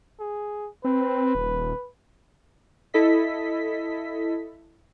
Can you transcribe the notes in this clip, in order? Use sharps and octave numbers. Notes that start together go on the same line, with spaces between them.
G#4
C4 B4
D#1
E4 A4 D#5 B6